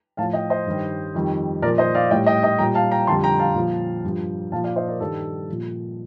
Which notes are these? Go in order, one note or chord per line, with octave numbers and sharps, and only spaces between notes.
A2 F3 F5 A5
D#5 G5
C5 D#5
G2 D#3 G3
F2 D#3 G3
A#2 F3 A#4 D5
C5 D#5
D5 F5
A2 G3 D#5 G5
D#5 G5
D#5 G5
A#2 G3 G5 A#5
F5 A5
G5 A#5
F2 D3 G3 A5 C6
G5 A#5
F5 A5
A#2 F3
G2 F3
A#2 F3 F5 A5
D5 F5
C5 D#5
A#4 D5
G2 D#3 G3 A4
A#2 F3